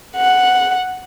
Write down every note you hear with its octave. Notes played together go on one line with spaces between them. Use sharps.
F#5